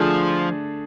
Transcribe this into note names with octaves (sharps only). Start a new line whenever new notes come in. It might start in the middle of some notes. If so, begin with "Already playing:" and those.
Already playing: D3 F3 A3 D4 G#4